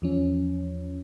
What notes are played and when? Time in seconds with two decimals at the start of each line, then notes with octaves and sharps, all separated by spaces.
0.02 E2 F3 C#4